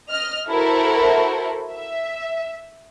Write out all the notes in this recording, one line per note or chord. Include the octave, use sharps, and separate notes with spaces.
D#5 F6
E4 F#4 A4 A#4 C5
E5